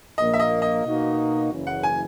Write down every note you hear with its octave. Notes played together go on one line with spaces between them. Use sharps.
A#1 A#2 A#3 D#5
E5
D#5
D#5
B2 A#3 D#4 F#4
F#1 F#2 C#3 E3
F#5
G#5